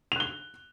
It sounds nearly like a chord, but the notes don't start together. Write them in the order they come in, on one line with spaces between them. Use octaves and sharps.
F7 F#6 G7